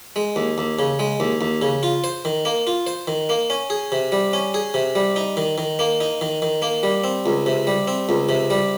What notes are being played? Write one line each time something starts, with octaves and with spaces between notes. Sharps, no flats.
G#3
D#2
D#2
C#3
G#3
D#2
D#2
C#3
F4
C5
D#3
A#3
F4
C5
D#3
A#3
C#4
G#4
C3
G3
C#4
G#4
C3
G3
D#4
D#3
D#3
A#3
D#4
D#3
D#3
A#3
G3
C4
C#2
C3
G3
C4
C#2
C3
G3